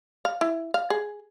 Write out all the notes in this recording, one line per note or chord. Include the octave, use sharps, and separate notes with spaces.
F5
E4
F5
G#4